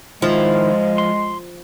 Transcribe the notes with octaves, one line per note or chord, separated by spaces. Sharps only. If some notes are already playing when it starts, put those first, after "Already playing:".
D#3 F3 G#3 E4
C6